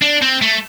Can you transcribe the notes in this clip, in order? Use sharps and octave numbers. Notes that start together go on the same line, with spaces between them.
D4
C4
A3